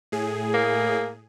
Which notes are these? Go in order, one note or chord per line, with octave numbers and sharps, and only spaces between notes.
A2 G#4
A#3